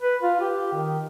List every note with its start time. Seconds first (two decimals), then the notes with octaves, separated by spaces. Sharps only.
0.02 B4
0.22 F4
0.40 G4
0.73 D#3